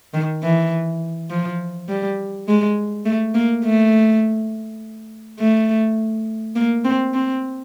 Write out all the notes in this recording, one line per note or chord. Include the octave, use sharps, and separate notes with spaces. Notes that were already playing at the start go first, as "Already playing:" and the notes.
D#3
E3
F3
G3
G#3
A3
A#3
A3
A3
A#3
C4
C4